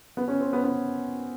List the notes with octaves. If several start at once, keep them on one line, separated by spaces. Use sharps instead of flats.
B3
C#4
C4
B3
B3